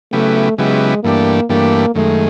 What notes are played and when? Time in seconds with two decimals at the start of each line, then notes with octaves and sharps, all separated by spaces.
0.12 C#3 F#3 A3 B3 E4 G4
0.58 C#3 F#3 G#3 B3 E4 G4
1.03 G2 E3 A3 A#3 D4 G4
1.49 G2 E3 A3 A#3 D4 G4
1.95 F#2 D#3 G#3 A3